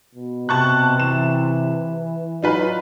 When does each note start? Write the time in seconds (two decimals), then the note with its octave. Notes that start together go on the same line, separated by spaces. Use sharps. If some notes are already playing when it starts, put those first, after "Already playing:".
0.15 B2
0.49 C3 A5 C#6 F#6
1.00 E3 E7
2.43 F#3 D#4 F4 B4